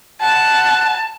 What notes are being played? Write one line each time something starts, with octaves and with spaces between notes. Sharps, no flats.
F#5 A5